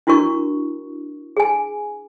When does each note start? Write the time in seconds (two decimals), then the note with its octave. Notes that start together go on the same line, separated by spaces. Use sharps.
0.07 D4 E4 F#4 A#4 C#6
1.37 G#4 G#5